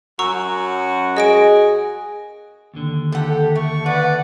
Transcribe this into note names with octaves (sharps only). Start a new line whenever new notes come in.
F#2 F#4 A#5 C#6 E6
G#4 D#5 A#6 D7
D#2 D3
G4 A4 F#5
A3 C#6
B4 D5 F#5